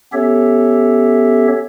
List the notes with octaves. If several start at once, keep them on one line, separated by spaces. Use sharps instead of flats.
B3 C#4 G4 A4 C#5 E5